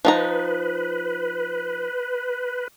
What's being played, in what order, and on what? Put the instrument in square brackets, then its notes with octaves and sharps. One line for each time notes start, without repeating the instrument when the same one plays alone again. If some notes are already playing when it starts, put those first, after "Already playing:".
[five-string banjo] F3 D#4 A#5 [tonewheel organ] B4